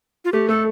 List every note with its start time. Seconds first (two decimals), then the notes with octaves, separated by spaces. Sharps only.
0.25 F4
0.32 A3 G4
0.49 A3 A4